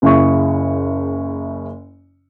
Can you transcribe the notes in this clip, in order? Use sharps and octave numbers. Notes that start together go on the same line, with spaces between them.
F#1 C#3 E4 C#6